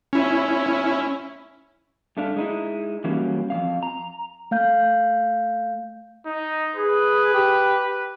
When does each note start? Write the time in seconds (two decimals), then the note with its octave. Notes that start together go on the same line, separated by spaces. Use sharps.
0.13 C#4 E4
2.17 G2 A3 D4 F5
2.36 G#3 D#4 E4
3.04 E3 F#3 G3 A#3 C#4
3.50 F2 G3 F5
3.83 A#5
4.51 A3 F5 G6
6.26 D#4
6.76 G#4 B4
7.34 G4